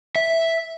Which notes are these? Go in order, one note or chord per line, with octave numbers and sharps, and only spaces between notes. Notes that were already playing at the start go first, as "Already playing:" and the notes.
E5